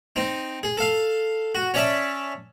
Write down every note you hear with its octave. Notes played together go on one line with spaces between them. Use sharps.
C4 D#4
G#4
A4 F5
F#4
C#4 C#5 D5 E5 A5